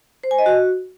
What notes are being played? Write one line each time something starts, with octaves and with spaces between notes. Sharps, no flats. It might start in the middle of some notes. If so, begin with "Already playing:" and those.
C5
G#5
D#5
F#4